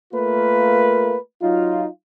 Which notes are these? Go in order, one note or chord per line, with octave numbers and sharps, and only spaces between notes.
A3 A#3 F4 A#4 B4
F#3 D#4 F4